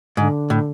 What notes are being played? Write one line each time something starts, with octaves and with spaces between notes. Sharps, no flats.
G#2 D3
A2